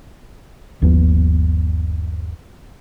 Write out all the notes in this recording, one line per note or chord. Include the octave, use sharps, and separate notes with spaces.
G1 D#2 F3 B3